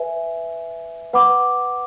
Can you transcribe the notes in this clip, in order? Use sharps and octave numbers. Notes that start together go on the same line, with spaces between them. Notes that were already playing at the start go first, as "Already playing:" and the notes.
Already playing: B4 E5 G#5
B4 F#5 B5 D6